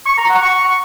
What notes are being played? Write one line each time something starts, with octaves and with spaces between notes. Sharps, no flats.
C#6
A#5
F#5
C#6